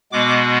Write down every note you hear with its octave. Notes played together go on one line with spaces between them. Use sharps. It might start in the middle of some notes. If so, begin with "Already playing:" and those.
B2 G#3 B3 D6